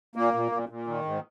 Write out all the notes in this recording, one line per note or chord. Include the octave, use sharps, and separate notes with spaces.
A#2 A#3
A#2
A#2
A#2
D#3
G#2